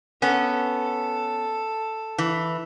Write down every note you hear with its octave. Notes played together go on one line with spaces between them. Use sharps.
B3 C#4 A4
E3